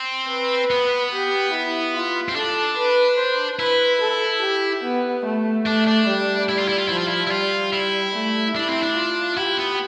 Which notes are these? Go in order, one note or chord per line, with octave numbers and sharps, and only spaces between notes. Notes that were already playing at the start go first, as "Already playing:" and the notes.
Already playing: C4
B4
B3
G4
E4
F4
C4
D4 A4
B4
C5
E4 B4
A4
G4
B3
A3
A3 D4
D4
G3
E4
F4
E4
F4
F3 E4
F4
E4
E4
G3 F4
E4
A3
D4 E4
C4
D4
F4
E4 G4
B3